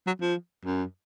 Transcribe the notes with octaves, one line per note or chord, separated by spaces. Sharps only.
F#3
F3
F#2